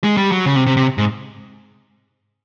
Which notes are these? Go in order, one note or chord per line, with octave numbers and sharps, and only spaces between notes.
G#3
G3
F#3
C#3
C3
C3
C3
G#2